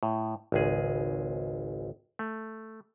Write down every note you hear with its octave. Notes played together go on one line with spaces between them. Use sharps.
A2
G#1 C#2 G#4
A3